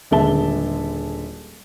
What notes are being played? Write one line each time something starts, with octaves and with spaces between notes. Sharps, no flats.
D#1 D3 G#3 E5 A5 G7